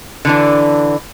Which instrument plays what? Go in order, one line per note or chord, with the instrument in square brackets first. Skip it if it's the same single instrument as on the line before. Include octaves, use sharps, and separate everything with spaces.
[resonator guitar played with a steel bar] D3 E3 D4